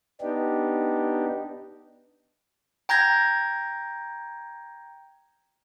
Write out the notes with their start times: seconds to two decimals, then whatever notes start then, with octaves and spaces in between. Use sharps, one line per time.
0.21 B3 D4 D#4 G4
2.89 G5 A#5 G6 G#6 A#6